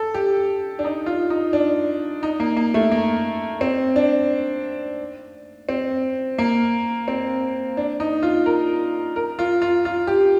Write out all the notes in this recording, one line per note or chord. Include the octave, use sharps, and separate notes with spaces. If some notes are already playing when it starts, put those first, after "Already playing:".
Already playing: A4
G4
D4
D#4
F4
D#4
D4
D#4
A#3
A#3
A3
A#3
C4
D4
C4
A#3
C4
D4
D#4
F4
A#4
A#4
F4
F4
F4
G4